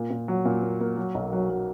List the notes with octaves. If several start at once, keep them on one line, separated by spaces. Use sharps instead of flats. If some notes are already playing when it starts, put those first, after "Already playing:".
Already playing: A#2
A#2
F#3
A#2
A#3
A#3
F#3
B1
F#3
F#3